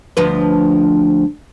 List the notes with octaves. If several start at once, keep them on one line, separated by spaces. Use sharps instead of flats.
D2 F3 B4